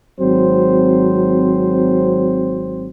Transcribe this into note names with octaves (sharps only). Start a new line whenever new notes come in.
G#1 F#3 C4 C5